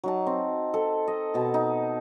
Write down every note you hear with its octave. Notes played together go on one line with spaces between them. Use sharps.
F#3 D#4 A5
C4
A4
D#5
B2 A5
D#4